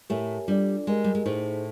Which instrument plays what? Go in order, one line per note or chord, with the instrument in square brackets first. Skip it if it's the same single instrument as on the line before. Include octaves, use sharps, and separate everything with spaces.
[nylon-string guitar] A2 A3 [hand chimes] G4 A#4 C#5 E5 G#5
[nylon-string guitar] G3 [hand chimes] D4 F4 A4 D5
[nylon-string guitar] G#3 [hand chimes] G4 A#4 D#5 G#5
[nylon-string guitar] G3
G#3
[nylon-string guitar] A2 A3 [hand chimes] D#4 G#4 C5